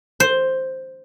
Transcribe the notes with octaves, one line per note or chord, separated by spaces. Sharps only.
C5